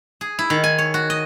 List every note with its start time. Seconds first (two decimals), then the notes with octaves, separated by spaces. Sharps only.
0.21 G#4
0.39 E4
0.50 D#3
0.64 G#5
0.78 C#5
0.94 F#4
1.10 D#5